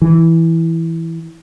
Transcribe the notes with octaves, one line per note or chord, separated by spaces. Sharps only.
E3